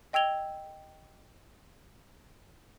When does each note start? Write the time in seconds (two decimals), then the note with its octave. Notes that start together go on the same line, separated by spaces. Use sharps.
0.13 D#5 G5 E6 G#6 F7 G7